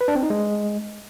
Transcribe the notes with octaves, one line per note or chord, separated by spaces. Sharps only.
B4
D4
C4
D#4
G#3